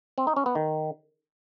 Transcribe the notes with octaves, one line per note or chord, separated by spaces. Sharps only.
C4
D#4
C#4
B3
D#3